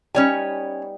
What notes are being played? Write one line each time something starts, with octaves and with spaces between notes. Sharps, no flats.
G3 B3 C#4 D#4 C#5 G#5